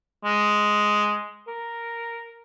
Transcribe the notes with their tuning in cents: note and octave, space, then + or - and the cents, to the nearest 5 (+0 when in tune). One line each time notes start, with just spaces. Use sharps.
G#3 +5
A#4 +0